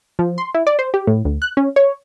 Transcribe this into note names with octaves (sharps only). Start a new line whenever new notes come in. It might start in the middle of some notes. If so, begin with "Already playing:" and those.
F3
C6
E4
D5
C5
G4
A2
D2
F#6
C#4
C#5